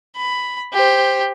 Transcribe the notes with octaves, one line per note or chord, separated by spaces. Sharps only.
B5
G4 C5